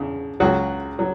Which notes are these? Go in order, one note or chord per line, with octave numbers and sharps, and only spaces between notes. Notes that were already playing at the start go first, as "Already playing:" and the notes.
Already playing: E2 C#3
C#2 C#3 F#3 F#4
F#3